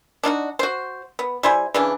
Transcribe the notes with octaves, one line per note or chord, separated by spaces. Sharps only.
D4 D#4 F4 F#4
F#4 C5
B3
G3 E4 C5 G#5
C#3 E3 D4